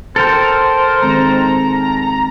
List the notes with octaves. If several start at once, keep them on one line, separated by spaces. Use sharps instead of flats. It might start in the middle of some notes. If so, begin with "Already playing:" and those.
A4 A#4 C5 G5
D#3 G#3 C4 A#5